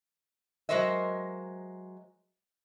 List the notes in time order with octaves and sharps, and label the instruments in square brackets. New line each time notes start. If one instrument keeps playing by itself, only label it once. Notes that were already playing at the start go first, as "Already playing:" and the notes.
[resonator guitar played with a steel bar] F#3 G#3 A#4 C5 D#5 E5